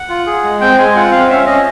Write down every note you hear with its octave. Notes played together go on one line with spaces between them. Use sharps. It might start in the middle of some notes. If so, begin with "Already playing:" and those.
Already playing: F#5
F4
G#4
G#3
C4 G5
G#3 G#5
F4 F#5
C4 F5
C#4 E5
C#4 D#5